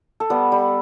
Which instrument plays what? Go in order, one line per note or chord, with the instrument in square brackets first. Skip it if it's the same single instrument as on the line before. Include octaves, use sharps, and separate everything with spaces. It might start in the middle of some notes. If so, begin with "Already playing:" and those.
[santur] A4
G3 B3 B4
G3